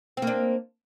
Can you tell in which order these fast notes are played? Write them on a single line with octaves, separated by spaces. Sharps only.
C4 A#3 D4